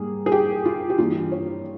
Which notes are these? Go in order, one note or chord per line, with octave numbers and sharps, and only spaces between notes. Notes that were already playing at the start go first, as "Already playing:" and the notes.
Already playing: G#2 G3 A#3 G#4
G#4
G4
F4
G4
G2 E3 G3 A#3 F4
C#5